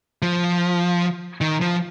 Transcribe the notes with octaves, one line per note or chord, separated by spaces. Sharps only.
F3
D#3
F3